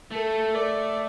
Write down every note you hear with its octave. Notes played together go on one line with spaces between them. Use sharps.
A3 A4
D5